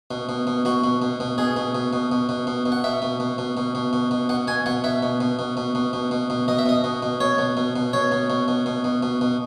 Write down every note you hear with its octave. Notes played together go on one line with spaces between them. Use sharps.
B2
B2
B2
B2 F#4
B2
B2
B2
B2 G#4
B2
B2
B2
B2
B2
B2
B2
F#5
B2 E5
B2
B2
B2
B2
B2
B2
B2
B2 F#5
B2 G#5
B2 F#5
B2 E5
B2
B2
B2
B2
B2
B2
B2
B2
B2 D#5
E5
B2 D#5
B2
B2
B2 C#5
B2
B2
B2
B2 C#5
B2
B2
B2
B2
B2
B2
B2